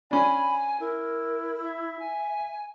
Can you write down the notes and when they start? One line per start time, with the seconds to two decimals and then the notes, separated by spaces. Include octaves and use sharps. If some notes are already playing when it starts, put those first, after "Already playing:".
0.11 C#4 D4 G#5 B5
0.80 E4 A#4
1.63 E5
1.99 G#5